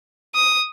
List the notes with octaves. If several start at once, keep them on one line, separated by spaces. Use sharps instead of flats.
D#6